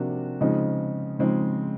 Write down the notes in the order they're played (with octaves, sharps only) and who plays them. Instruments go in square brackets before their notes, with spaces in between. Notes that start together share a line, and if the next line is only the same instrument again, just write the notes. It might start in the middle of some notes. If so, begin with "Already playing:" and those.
Already playing: [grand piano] C3 F3 A#3 D4 F#4
C#3 F3 G#3 C4 D#4
C#3 F3 G#3 C4 D#4